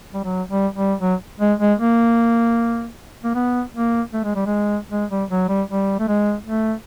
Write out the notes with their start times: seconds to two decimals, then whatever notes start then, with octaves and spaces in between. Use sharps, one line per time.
0.14 G3
0.24 F#3
0.49 G3
0.76 G3
1.01 F#3
1.40 G#3
1.60 G#3
1.80 A#3
3.23 A#3
3.34 B3
3.74 A#3
4.13 A3
4.24 G#3
4.35 G3
4.46 G#3
4.91 G#3
5.10 G3
5.30 F#3
5.48 G3
5.69 G3
5.99 A3
6.08 G#3
6.46 A3